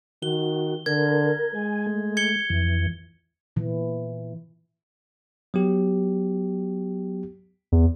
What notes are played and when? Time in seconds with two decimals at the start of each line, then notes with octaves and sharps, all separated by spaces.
0.23 D#3 F#4 G7
0.86 D3 A#4 G#6
1.55 G#3 G#5
1.86 A3
2.17 G#6 C#7 G7
2.50 F2 E3
3.56 A#2 E3
5.54 F#3 B3 G4
7.72 E2